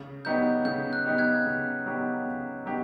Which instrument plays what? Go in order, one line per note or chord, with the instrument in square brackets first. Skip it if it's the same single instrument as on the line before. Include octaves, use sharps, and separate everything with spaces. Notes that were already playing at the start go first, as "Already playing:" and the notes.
Already playing: [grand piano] C#3
[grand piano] F#3 B3 D#4 G4 [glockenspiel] G6
[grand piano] C#3 [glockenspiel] G6
[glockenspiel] F#6
[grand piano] F#3 B3 D#4 G4
[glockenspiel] F#6 G#6
[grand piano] C#3
F#3 B3 D#4 G4
C#3
F#3 B3 D#4 G4